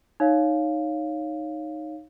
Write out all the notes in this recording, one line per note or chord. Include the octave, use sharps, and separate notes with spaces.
D#4 C#5 F5